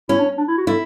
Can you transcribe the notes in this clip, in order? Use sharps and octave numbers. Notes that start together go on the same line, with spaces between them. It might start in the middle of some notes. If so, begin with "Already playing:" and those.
C#4 E4
D4
D4
E4
F#4
E4 A4